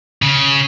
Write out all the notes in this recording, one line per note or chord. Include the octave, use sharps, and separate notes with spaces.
C#3